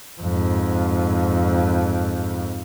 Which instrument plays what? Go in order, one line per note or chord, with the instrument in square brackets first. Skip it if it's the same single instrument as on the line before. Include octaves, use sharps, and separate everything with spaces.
[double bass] F2 G#2